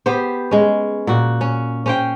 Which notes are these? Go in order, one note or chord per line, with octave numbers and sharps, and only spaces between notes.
B3 G4 C5
G#3 C#4
A#2 F#4
C#4
C#4 C5 G5